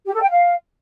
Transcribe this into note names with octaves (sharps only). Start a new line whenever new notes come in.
G4
A4
G5
F5